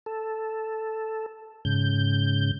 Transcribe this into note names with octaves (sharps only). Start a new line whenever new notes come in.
A4
G#2 C#3 G6